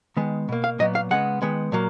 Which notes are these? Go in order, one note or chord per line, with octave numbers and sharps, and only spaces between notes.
D#3 G#3 B3
B2 A#3
F5
A#2 F#3 B3 D#5
F5
C#3 G#3 B3 F#5
D#3 G#3 B3
A#2 F#3 A#3